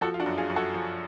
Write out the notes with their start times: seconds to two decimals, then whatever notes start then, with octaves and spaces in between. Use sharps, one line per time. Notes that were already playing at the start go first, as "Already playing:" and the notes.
0.01 F3 F#4 A4
0.14 F4
0.20 D4 F#4
0.26 F#2
0.38 F4 G#4
0.50 F#2
0.56 F#4 A4
0.74 F3